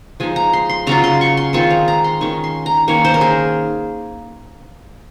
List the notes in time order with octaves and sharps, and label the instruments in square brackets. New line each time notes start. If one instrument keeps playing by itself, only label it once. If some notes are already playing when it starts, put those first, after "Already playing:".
[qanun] F3 G#3 D#4 G#5
A#5
C6
C6
C#3 F#3 C#4 F4 A#5
C6
C#6
C6
D#3 G#3 C4 F4 C#6
A#5
A#5
C6
D#3 G#3 C#4 C#6
C6
A#5
D#3 A#3 C#4 C#5
C5
A#4
G#4